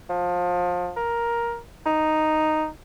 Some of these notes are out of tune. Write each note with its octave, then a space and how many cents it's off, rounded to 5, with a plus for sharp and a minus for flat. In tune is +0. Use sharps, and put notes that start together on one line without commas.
F3 +25
A#4 +10
D#4 -5